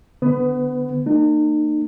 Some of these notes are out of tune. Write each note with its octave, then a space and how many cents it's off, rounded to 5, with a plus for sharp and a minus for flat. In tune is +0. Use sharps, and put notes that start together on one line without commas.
D3 +0 B3 +15 B4 +35
A#3 -35 D#4 -40